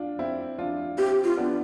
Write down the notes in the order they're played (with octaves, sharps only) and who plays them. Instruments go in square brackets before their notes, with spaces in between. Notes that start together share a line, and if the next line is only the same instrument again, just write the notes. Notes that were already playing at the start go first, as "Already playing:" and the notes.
Already playing: [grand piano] D4 F4
C4 E4
D4 F4
[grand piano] C4 E4 [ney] G4
[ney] F4
[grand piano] B3 D4